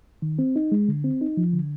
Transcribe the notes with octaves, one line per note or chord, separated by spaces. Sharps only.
D#3
C4
D#4
G#3
D3
C4
D#4
F3
D3